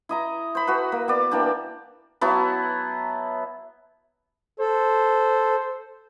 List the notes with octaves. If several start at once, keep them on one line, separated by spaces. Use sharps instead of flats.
E4 D#5 A#5
C5 B5
F#4 A4 B4
A#3
B3 D5
E3 A#3 D4 G4
F#3 B3 E4 A5
A4 C5